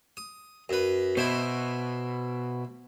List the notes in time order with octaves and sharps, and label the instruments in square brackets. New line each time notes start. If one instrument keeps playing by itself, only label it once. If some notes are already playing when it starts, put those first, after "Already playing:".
[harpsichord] D#6
F#2 B4
[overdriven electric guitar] B2 [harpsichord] E4 C5